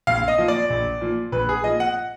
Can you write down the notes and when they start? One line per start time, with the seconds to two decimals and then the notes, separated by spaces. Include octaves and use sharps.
0.07 A#1 F5
0.28 D#5
0.38 A#2 F3
0.48 D5
0.70 A#1
1.01 A#2 F3
1.32 A#1 B4
1.49 G#4
1.64 A#2 F3 D#5
1.80 F#5